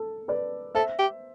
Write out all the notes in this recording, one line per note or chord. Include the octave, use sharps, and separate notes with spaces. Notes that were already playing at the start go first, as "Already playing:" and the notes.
Already playing: A4
B4 D5
A4 C5 E5
G4